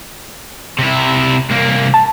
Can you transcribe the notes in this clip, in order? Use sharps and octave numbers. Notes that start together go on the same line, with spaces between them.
C3 E4
C2 A#3
A5